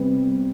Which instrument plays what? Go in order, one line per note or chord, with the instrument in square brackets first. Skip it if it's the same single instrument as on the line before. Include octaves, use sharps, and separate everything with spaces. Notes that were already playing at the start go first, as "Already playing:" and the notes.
Already playing: [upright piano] C3 G3 B3